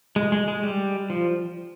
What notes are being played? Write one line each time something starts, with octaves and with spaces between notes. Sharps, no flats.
G#3
G#3
G#3
G3
F3